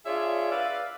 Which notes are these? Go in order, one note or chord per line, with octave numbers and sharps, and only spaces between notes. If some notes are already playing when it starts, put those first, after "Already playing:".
D4 F4 G#4 C#5 E5
B4 D5 E5 F5